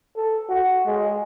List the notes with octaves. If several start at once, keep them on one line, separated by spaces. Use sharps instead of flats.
A4
F#4
G#3